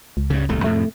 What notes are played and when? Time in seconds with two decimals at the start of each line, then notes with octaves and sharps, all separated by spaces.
0.17 C#2
0.30 G2 C#3
0.48 D#1 C2 A3
0.64 F2 A2 C3 A3